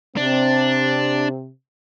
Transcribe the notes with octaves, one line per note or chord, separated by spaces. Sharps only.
C3 C4 D4